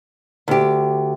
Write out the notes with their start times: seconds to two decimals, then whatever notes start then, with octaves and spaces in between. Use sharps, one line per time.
0.48 D2 G4